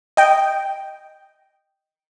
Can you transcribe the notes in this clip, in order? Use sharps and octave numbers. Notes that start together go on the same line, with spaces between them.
D#5 G5